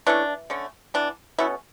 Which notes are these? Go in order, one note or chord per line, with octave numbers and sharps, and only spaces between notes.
E3 A3 C#4 D4
D3 A3 C#4
E3 B3 D4
B2 A3 C#4 E4